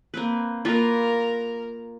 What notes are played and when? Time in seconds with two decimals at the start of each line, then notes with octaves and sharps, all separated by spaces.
0.14 A#3 C4 B4
0.65 A#3 F4 A#4 B4